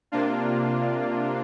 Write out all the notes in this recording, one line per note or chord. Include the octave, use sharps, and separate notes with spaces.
C3 A#3 D4 F4